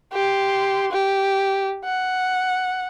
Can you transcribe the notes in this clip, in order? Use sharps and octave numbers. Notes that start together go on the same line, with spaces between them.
G4 C6
G4
F#5